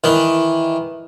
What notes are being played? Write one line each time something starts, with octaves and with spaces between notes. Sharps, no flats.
D#3 E3